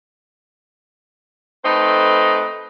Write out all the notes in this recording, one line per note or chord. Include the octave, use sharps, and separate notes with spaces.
A3 C4 D#4 A4 B4